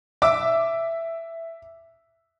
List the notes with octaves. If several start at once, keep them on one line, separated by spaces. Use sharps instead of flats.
E5 D6 E6